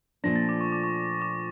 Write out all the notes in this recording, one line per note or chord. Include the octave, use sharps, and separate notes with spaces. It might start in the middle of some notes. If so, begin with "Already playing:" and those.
A#2 F3 A3 D4 A#6
A6
D6
C#6
D6
C#6
D6